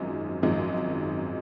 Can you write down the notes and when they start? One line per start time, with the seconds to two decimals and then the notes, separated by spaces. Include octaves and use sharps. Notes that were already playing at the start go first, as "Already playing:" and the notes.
Already playing: G#1 F#2 F3 G#3 D#4
0.42 G#1 F#2 F3 G#3 D#4